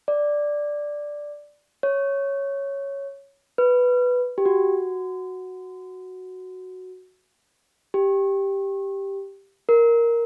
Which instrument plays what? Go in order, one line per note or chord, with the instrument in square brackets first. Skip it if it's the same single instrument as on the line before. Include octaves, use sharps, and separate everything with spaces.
[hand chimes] D5
C#5
B4
G4
F#4
G4
A#4